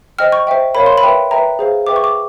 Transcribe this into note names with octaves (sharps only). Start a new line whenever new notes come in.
C5 D#5 G5 F6
C#6
C5 E5 G5
A#4 C#5 F5 B5
C6
B5
B4 E5 G5
B4 E5 G5 A#5
G#4 C5 F5
G#4 B4 E5 G5 D6
C#6
D6